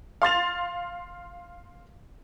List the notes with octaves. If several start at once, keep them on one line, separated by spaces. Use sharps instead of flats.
F5 C6 A6 F7